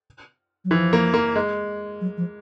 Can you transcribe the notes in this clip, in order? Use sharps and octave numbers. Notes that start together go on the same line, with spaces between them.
F#3
E3 F3
A#3
A#3
G#3
F#3
F3